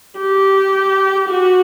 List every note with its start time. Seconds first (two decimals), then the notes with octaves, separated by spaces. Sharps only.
0.18 G4
1.28 F#4